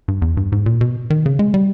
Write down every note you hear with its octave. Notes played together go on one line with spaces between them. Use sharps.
G2
E2
G2
G#2
A#2
B2
D#3
C#3
G#3
G3